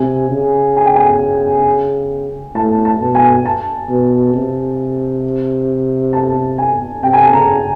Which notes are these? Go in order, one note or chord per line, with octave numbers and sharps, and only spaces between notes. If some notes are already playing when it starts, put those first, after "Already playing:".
Already playing: C3 G#5
C#3
G#5
G5
G#5
A2 A5
A5
B2
G#5
A5
B2
C3
A5
G#5
C3 G5
G#5
A5
C#3 A#5